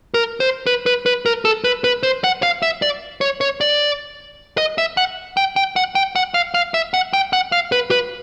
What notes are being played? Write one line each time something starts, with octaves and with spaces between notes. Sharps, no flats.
A#4
C5
B4
B4
B4
A#4
A4
B4
B4
C5
F#5
F5
E5
D5
C#5
C#5
D5
D#5
E5
F#5
G5
G5
F#5
G5
F#5
F5
F5
E5
F#5
G5
F#5
F5
B4
B4